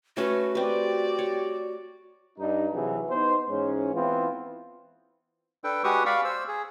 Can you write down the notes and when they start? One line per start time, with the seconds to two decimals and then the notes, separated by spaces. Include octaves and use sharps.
0.17 A3 C#4 F#4 B4
0.55 C4 G4 B4 D5
1.19 C#5
2.39 G2 D#4
2.73 C3 E3 F#3 G#4
3.11 B3 D#4 C5
3.49 G#2 E3 C#4
3.94 E3 B3 C4 E4 F4
5.64 D4 A4 B4 G5
5.84 G#3 F#4 G4 B4 C#6 D#6
6.06 D5 F5 B5 C#6
6.24 C5 E6
6.48 G#4